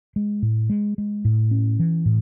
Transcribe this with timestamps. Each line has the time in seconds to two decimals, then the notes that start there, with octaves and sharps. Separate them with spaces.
0.16 G#3
0.42 A2
0.70 G#3
0.98 G#3
1.25 A2
1.51 C#4
1.79 E3
2.06 A2